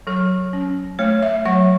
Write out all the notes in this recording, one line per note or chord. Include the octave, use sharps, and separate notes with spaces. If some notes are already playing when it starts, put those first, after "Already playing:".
F#3 A4
C#4
A3 C#5
E5
F#3 F#5